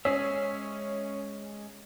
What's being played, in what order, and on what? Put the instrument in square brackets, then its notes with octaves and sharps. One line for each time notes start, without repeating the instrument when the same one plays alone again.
[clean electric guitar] G#3 G#4 E5 [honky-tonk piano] C#4